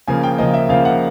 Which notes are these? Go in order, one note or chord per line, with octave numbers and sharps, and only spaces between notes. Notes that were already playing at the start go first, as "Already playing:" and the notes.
C#3 F3 A#3 G#5
G5
C#3 F3 A#3 D#5
E5
C#3 F3 A#3 F5
F#5